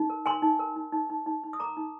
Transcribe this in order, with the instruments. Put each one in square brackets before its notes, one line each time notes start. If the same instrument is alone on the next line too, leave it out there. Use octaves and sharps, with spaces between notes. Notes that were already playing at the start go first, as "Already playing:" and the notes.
Already playing: [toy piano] D#4
A#4
A#4 G#5 C6
D#4
A#4
D#4
D#4
D#4
D#4
D#4
D#6
A#4 A#5 D6
D#4